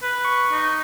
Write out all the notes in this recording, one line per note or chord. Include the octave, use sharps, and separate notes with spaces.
B4
C#6
D#4